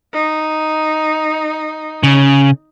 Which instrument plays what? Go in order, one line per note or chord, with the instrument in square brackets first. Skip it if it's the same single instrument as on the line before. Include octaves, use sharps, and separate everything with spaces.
[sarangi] D#4
[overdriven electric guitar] C#3